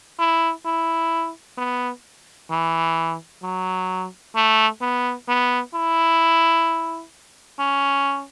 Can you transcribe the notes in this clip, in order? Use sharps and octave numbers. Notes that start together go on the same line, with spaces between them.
E4
E4
B3
E3
F#3
A3
B3
B3
E4
C#4